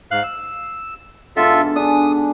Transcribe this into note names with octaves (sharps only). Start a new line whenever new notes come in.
G#2 F5 F#6
E6
G#2 B2 D3 F4 A4 E5
D4 G#4 D#6